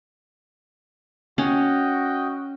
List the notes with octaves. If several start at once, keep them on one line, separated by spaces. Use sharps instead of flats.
C#4 F#4 D#5 G5